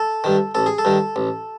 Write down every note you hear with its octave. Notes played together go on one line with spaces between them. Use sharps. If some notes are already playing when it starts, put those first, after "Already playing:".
Already playing: A4
G2 D#3
A1 A4
G#4
A4
G2 D#3
A1